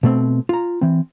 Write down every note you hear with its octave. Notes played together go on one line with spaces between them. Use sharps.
B2 A3 C4
F4 A#5
E3 C4